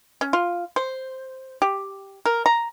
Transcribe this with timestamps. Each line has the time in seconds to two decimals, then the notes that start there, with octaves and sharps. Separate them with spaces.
0.21 C#4
0.33 F4
0.76 C5
1.62 G4
2.26 A#4
2.46 A#5